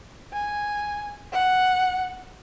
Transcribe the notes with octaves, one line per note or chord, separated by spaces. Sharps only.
G#5
F#5